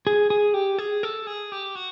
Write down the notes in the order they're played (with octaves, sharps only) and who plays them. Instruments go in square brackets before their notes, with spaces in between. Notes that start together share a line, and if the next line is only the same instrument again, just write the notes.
[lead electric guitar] G#4
G#4
G4
G#4
A4
G#4
G4
F#4